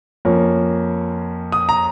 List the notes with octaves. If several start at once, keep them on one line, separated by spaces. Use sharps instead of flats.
F2 F3 A#3 C#4
D#6
A#5